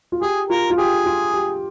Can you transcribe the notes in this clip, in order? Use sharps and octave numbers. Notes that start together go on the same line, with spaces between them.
F4
G4 G#4
F4 A#4
F4
G4 G#4
F4
G4